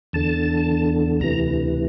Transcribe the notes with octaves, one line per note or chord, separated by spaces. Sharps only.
E2 D3 A5
D2 C3 E3 A#5